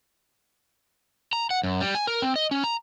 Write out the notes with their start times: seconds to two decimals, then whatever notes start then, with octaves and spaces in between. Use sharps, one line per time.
1.33 A#5
1.51 F#5
1.63 F#2
1.81 G3
1.95 G#5
2.07 A#4
2.22 C4
2.36 D#5
2.51 C#4
2.64 A#5